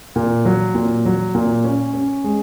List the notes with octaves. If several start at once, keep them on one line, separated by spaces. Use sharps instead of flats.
A#2
F#3
A#2
F#3
A#2
C#4
C#4
G#3